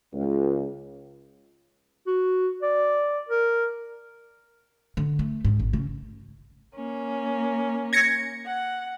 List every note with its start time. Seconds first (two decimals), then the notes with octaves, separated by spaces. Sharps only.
0.12 C#2
2.07 F#4
2.62 D5
3.29 A#4
4.97 D3
5.19 A3
5.45 G#2
5.60 G#1
5.73 C#3
6.74 A#3 C#4
7.93 G#6 A#6 C#7
8.45 F#5